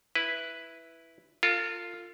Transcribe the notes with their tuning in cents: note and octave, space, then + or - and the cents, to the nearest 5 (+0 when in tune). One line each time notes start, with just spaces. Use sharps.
E4 +0 B4 +0
F4 +0 A4 +45